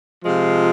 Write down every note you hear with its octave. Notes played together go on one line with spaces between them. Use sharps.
C3 F3 G#3 F4